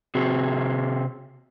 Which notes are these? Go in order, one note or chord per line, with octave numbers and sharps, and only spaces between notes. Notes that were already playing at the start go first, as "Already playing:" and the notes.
C3 C4 F#4 G#4